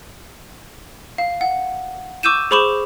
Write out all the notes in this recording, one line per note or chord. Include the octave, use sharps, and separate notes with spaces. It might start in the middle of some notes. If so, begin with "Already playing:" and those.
F5
F#5
C#6 D6 E6 G6 D#7 E7
G#4 C5 B5 C#6 D6 E7